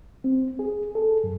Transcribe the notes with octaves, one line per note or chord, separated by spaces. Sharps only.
C4
G#4
A4
F#2